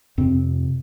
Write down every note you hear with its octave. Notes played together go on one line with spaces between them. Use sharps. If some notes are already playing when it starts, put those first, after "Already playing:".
F2 C3 C4